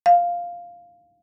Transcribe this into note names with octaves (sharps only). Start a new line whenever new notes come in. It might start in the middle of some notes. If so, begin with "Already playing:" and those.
F5